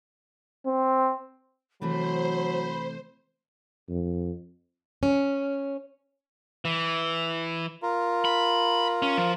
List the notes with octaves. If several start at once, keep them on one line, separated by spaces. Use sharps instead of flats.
C4
C3 E3 F#3 A3 C5 B5
F2
C#4
E3
F4 A#4
B5
C#4
F3